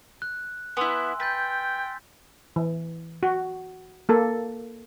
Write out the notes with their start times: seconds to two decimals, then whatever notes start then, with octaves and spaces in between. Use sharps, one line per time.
0.22 F#6
0.77 B3 E4 G#5 C6 E6
1.20 B4 G5 G6 A6 B6
2.56 E3
3.23 F#4
4.09 A#3 A4